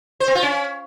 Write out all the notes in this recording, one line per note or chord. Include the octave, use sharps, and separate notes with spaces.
C5
C4
F4
C#4